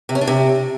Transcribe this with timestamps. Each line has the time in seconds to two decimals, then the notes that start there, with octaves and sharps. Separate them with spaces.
0.09 C3
0.15 C#4
0.21 D4
0.27 C3